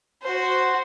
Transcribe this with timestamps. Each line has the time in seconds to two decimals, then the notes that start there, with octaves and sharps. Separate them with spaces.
0.22 F#4 C5